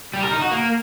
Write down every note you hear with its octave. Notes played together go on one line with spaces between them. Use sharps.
G3
A#4
D#4
F#4
A#3